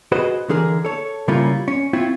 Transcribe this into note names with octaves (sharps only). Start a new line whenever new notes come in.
F#4 G#4 B4 C5 D#5
D3 E3 G#4 A#4
A4 C#5
C#3 G3 A#3 C#4 E4 F4
C#4
C4 E4 F4 C#5